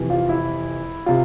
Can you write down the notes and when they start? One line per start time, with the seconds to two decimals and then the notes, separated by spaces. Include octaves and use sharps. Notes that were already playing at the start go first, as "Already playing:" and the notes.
Already playing: F2 C3 E3
0.10 F4
0.29 E4
1.06 C3 F4